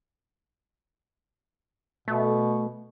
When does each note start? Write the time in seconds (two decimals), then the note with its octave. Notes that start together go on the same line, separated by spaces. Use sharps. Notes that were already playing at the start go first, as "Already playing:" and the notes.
2.08 B2 A3